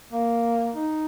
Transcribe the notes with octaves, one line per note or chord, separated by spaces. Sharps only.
A#3
D#4